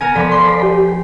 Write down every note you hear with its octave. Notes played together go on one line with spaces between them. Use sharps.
B3 A#4 G#5 A#5
F3 B3 A4 D5 B5
C6 C7
G4